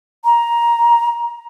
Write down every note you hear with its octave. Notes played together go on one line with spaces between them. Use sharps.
A#5